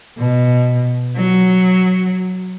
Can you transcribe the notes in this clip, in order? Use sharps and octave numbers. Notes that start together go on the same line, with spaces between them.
B2
F#3